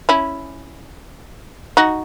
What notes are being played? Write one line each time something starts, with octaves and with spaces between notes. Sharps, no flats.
C#4 E4
D#4 F#4